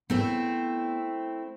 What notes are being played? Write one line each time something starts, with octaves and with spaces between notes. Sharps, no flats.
A3 B3 C4 E4